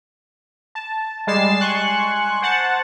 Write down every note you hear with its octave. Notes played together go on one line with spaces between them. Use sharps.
A5
G3 G#3 A6 C7 E7
G#5 C6 C#6 F#6
C5 F#5 A5